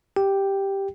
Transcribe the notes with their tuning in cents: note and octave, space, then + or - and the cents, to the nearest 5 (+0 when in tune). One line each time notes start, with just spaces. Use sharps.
G4 +0 G5 +0